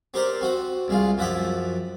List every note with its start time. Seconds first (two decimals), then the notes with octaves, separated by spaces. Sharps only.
0.14 C4 G4 A#4 C5 D5
0.41 C4 F#4 F#5
0.88 C2 G#3 F4
1.18 F#2 F3 E5 F#5 G5 D6